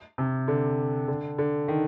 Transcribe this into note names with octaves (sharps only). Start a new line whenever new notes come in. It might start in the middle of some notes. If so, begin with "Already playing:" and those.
C3
D3
D3
D3
D#3